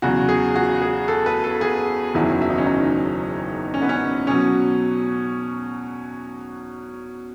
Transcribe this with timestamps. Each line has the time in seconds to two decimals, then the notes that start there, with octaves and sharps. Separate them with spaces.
0.02 E2 C#3 F#3 F#4
0.29 G#4
0.56 F#4
0.82 G#4
1.08 A4
1.26 B4
1.44 A4
1.61 G#4
2.14 F#1 E2 D#3 F#3 E4
2.42 E4
2.50 D#4
2.58 C#4
2.66 D#4
3.74 C#4
3.82 B3
3.89 C#4
4.27 B2 F#3 C#4